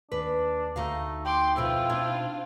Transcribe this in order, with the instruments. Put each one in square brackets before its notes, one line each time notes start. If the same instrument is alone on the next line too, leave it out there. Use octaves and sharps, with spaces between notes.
[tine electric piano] D#2 G#4 [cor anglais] D4 [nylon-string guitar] B4
[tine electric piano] D2 [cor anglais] A3 [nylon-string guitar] D#4 F#4 F5
[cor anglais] G5 [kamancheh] C6 D6
[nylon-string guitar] F2 B2 G5 [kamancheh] C4 F4 [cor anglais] E4
[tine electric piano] B2 D#4 G#6 [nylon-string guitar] D4